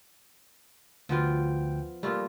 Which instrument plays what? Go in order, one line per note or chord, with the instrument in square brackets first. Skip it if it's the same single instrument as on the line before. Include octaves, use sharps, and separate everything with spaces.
[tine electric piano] D2 G5 [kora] F3 B3 F4
[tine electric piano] G3 A#3 [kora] A3 F4